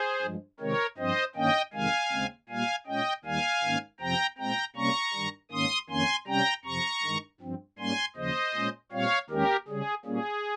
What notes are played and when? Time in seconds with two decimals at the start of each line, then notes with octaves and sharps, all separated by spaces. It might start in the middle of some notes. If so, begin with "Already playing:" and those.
Already playing: G#4 C5
0.22 G2 F3 G#3
0.60 C3 D#3 G#3 C4 A#4 C#5
0.98 G2 F3 C4 C5 D#5
1.36 G2 D#3 A#3 C#4 D#5 G5
1.73 F2 C3 D#3 G#3 F5 G#5
2.12 D#2 C#3 G#3 C4
2.49 A#2 G3 A#3 F5 G#5
2.87 A#2 G#3 C#4 D#5 G5
3.24 D#2 D#3 G3 F5 G#5
3.63 G#2 D#3 A#3 C#4
4.00 F2 C3 F3 C4 G5 A#5
4.38 A#2 G#3 C4 G5 A#5
4.76 C3 G3 A#3 C#4 A#5 C#6
5.13 G2 D#3 G3
5.51 G#2 D#3 A#3 C#4 C6 D#6
5.90 F2 D#3 A#3 C#4 G#5 C6
6.27 C3 G3 C#4 G5 A#5
6.65 F2 C3 F3 A#5 C#6
7.03 G2 D#3 G#3
7.41 G2 F3 C4
7.79 G#2 G3 A#3 C#4 G#5 C6
8.16 D#2 C#3 F3 C5 D#5
8.55 A#2 G#3 C#4
8.92 A#2 G3 C4 C#5 F5
9.30 D#2 D#3 G#3 C#4 G4 A#4
9.68 C#3 G3 C#4 G#4
10.05 A#2 G3 A#3 C#4 G#4